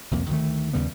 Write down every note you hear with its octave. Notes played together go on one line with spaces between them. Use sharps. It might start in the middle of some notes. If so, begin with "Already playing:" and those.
C2 F2 G#3 A#3
D2 D#3 A3
D#2 C#3 G3 B3